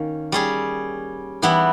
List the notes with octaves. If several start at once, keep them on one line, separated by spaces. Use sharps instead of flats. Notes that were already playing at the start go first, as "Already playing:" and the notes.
Already playing: D#3 A#3 C#4
G3 C#4 G#4
E3 G3 B3 E4